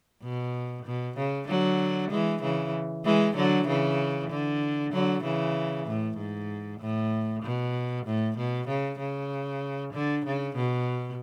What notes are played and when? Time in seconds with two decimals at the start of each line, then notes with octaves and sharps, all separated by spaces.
0.23 B2
0.85 B2
1.17 C#3
1.48 D3 F#3
2.11 E3 G#3
2.42 C#3 E3
3.05 E3 G#3
3.35 D3 F#3
3.67 C#3 E3
4.30 D3
4.92 D3 F#3
5.23 C#3 E3
5.86 A2
6.17 G#2
6.80 A2
7.43 B2
8.06 A2
8.37 B2
8.68 C#3
8.99 C#3
9.93 D3
10.25 C#3
10.56 B2